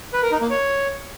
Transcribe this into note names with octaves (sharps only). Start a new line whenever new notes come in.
B4
A#4
D#4
A#3
C#5